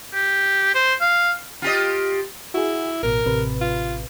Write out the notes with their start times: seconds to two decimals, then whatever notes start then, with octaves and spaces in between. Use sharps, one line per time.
0.14 G4
0.75 C5
1.01 F5
1.62 F4 G4 D#5
2.54 E4 F#4 G#4
3.03 A1 B2 A#4
3.25 A1 C3 B4
3.61 F4